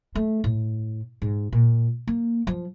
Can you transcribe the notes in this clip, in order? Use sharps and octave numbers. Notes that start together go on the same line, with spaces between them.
A3
A2
G#2
A#2
A#3
F3